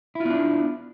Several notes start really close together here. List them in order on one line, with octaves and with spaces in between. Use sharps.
E4 F4 B3 D4